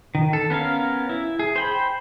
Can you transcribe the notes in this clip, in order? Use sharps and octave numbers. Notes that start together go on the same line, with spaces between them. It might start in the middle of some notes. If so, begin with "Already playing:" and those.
D#3
A4
B3 C#4 A#4 F5
E4
G#4
C5 G5 B5